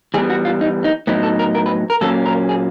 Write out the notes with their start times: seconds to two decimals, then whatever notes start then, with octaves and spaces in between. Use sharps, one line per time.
0.14 E3 G3 B3 G#4
0.30 F#4
0.45 F4
0.61 D#4
0.84 D#4
1.07 A2 F#3 B3 D#4 E4
1.23 A4
1.39 A#4
1.55 A#4
1.66 B4
1.90 A#4
2.01 A#2 F#3 A#3 C#4 A4
2.26 A#4
2.49 G#4